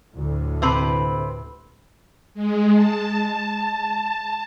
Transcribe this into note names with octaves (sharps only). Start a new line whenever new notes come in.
D2 A2
C3 C4 B4
G#3
A5